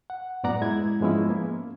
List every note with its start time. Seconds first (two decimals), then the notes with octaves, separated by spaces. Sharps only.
0.10 F#5
0.43 F#2 A2 B3 D5 F#5 A#5
0.61 G#3 E4 G#6
1.00 G#2 F3 G#3 B3 C#4 E4
1.30 A#3